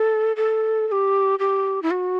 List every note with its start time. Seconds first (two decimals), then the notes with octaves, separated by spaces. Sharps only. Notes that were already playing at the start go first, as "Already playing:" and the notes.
Already playing: A4
0.36 A4
0.88 A4
0.92 G4
1.39 G4
1.82 E4
1.91 F#4